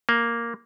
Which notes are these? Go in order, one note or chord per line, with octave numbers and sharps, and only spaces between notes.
A#3